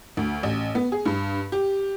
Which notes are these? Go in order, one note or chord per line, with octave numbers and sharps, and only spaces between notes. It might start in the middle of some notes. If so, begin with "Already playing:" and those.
D2
A1
B3
G#4
G2
G4